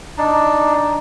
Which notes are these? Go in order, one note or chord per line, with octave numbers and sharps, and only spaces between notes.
D4 D#4